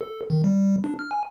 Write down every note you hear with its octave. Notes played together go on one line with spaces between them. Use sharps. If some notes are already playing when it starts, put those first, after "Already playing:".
A4
D#3
G3
D4
F6
G#5